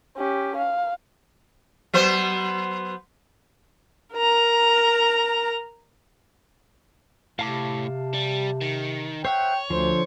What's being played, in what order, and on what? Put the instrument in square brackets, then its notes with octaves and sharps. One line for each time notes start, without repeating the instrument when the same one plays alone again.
[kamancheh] C#4 G4
F5
[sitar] F#3 B3 C5
[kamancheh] A#4 A#5
[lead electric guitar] A2 [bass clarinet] C3 [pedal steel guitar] F5 A5 D6
[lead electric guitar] G3
D#3
[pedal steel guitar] C5 E5 F#5 [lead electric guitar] C#5 [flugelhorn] G5
[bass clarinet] D2 [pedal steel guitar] D3 F3 [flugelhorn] C5